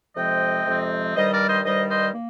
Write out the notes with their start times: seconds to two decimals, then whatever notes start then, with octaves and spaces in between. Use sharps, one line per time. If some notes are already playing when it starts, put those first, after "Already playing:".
0.16 F2 C3 F3 G#3 C4 D#5 G5
0.65 F2 C3 F3 G#3 C4
1.14 G2 D#3 G3 C5 D#5
1.31 A#4 D5
1.47 C5 D#5
1.65 G2 D#3 G3 C5 D#5
1.89 C5 D#5
2.14 A#3